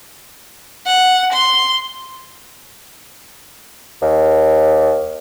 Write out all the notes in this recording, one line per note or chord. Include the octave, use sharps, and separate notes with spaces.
F#5
C6
D#2